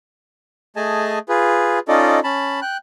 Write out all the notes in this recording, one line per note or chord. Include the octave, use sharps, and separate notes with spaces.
A3 G#4 D#5 G#5 A5
F4 G#4 B4
C#4 D#4 F4 A4 D5 D#5
C#4 A5 B5
G5 F#6